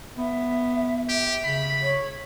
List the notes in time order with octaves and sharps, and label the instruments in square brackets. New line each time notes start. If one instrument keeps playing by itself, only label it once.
[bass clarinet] B3 [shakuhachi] E5
[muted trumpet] G4 [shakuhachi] E5
[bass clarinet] C#3 [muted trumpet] B5
[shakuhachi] C#5